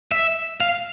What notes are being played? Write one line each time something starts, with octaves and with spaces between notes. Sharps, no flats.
E5
F5